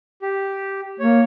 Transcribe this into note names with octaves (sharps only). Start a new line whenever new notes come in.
G4
A#3 C#5